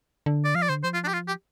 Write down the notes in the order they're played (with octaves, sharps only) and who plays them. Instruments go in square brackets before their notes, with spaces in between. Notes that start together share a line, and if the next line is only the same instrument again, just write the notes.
[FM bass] D3
[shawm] D5
[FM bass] F3 [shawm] F5
[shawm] D5
[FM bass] D3 [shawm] C5
[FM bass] F3 [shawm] C5
[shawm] F4
D4
G4
F4
G4